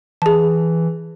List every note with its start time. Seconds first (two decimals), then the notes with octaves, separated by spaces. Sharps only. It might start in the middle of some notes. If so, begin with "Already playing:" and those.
0.22 E3 G#4 A5